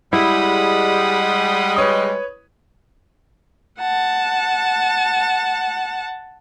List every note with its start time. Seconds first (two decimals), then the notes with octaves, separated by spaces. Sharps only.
0.13 G3 G#3 E4 F#5 B5 D#6
1.76 B4 C#5 D#6
3.79 F#5 A5